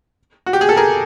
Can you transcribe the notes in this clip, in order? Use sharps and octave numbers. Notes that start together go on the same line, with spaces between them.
F#4
G4
G#4
A4
G#4 A#4